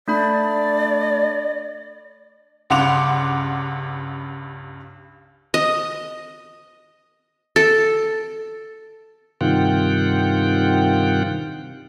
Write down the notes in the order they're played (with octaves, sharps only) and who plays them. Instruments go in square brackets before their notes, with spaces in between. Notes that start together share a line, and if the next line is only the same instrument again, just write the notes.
[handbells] A3 D4 B5 [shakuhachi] D5
[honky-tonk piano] C#2 G2 F#5 C6 D6 F7
[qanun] D#5
A4
[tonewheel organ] G2 C3 D#3 F4 F#5 G5